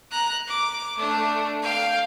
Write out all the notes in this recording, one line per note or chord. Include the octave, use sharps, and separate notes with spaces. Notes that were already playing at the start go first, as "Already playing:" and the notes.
A#5 F#6
D6
A3 D4
F5 G5